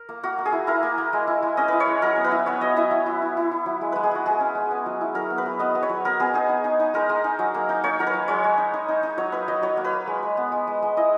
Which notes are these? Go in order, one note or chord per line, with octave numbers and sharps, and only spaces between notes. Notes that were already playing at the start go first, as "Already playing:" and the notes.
Already playing: A#4
A#3
A#3 F#4
A#3
G#4
E4
E4 A#4
A#3
A#3
G#3
E4
G#3
C#4 D#5
E4 B4
C#5
G#3
F#3 A#4
B3
B4
E4
B3 C#5
F#3 D#5
E4 E5
F#3
E4
E4
E4
E4
F#3
G#3
G#3 B4
G#4
G#3 F#4
G#3 G#4
C#4
G#3
B3
F#3
E4
F#3 A#4
B3
B4
F#3
B3 D#5
B3
C#5
F#3
B3 A#4
B3 G#4
D#4 G#4
D#4
D#4
D#4
G#3 A#4
G#3
D#4
F#3
A#3
D#4
A#3 C#5
F#3 A#4
B4
F#3
G#3 C#5
G#3
D#4
D#4
D#4
D#4
F#3 C#5
A#3 B4
F#3 D#5
F#3 C#5
A#3
B4
A#3
G#3
G#3
B3
G#3
G#3
G#3
E4 D#5